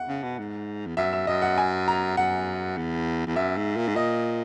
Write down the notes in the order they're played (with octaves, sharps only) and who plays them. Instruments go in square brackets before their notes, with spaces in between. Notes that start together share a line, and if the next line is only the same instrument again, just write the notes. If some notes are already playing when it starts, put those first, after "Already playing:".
Already playing: [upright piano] F#5
[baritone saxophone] C#3
B2
G#2
E2
[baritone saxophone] F#2 [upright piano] E5
[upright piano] E5
[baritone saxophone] F#2 [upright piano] D#5
[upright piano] F#5
G#5
A#5
[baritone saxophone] F#2 [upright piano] F#5
[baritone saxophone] E2
E2
[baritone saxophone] F#2 [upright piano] E5
[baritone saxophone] G#2
A#2
G#2
[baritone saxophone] A#2 [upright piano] D#5